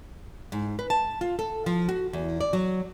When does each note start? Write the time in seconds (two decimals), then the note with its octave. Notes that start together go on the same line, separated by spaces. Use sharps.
0.52 G#2
0.79 B4
0.90 A5
1.21 F4
1.39 A4
1.66 F3
1.89 F#4
2.13 E2
2.41 D5
2.53 F#3